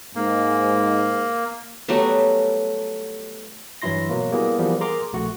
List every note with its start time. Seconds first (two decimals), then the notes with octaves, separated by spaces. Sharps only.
0.16 G#2 A#3
1.88 F#3 G3 A3 B3
3.82 G2 E3 F#3 E4 C6 A#6
4.09 B2 F#3 A#3
4.31 G3 A#3 B3 E4 G#4
4.59 E3 F3 G3 A#3 B3
4.81 G#4 A#4 A#5 C6 D6
5.13 A#1 A3 F#4